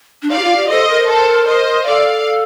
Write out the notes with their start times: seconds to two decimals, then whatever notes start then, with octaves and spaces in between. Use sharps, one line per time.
0.22 D4
0.31 D#4 D5 F5
0.38 G4
0.44 F4
0.56 G4
0.70 A4 C5 D#5
0.89 A#4
1.09 A4 C5
1.48 C5 D#5
1.87 A4 D5 F5